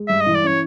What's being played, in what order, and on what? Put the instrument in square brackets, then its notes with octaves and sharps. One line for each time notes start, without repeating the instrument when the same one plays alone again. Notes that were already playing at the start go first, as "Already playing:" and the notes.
Already playing: [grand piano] G#3
[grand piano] G2 [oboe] E5
[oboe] D#5
[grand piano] E3
[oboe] D5
[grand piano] C#4 [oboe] C#5